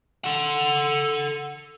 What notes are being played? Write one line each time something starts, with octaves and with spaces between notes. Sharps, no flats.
A4 F#5